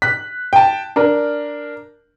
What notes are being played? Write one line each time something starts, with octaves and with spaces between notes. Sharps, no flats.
F#6 B6
G5 A5
D4 A#4